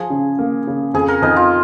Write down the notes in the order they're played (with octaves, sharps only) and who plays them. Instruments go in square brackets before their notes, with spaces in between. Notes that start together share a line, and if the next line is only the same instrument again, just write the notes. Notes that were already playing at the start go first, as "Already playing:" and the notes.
Already playing: [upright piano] F3 [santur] G#4
[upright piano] C#3
A#3
C#3
[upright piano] F2 [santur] G#4
[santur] A#4
[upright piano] F2 [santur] D#4
[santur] F4